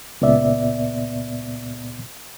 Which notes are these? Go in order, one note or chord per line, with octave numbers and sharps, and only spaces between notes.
C#2 A#2 B3 D5 E5